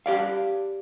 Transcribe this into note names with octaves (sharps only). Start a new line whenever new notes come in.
G4 D5 F5